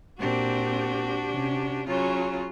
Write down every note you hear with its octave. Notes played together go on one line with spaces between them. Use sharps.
A#2 C4 D4 F#4 G4
C3 C#4
C#3 F#3 C#4 F4